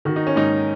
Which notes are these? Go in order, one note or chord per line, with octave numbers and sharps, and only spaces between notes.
D#3 F#4
D#4
C#4
G#2 D#4